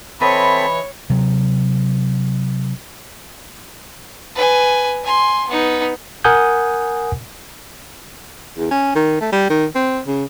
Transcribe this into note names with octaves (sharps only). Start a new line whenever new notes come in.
E3 C4 A4 B4 C#5 D#5 E5 B5
C3 F#3
B4 G#5
G#5 C6
B3 D#4
A#4 F#5 G#5 D#6 G6
E2
C#4
D#3
A3
G3
D#3
C4
C#3